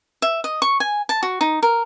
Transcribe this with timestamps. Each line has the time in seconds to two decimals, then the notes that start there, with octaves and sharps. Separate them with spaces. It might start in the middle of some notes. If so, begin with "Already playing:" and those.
0.22 E5
0.44 D#5
0.62 C#6
0.80 G#5
1.09 A5
1.23 F#4
1.41 D#4
1.63 A#4